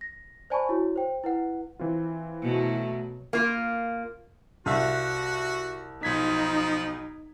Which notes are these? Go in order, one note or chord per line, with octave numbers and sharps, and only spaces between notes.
A#6
C5 D5 G#5 A5 B5 C#6
E4 F#4 C#5
C5 G5
E4 B4 F#5
E3 C4 F4
B2 F#3 A3
A#3 F4
C2 F4 F#4 E5
B1 F3 D#4 G#6 B6